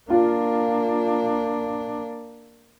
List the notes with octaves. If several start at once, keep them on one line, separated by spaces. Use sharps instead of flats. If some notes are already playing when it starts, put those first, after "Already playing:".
A#3 D4 F4